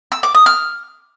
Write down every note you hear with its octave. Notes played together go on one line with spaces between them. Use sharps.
E6
D6
D#6
F6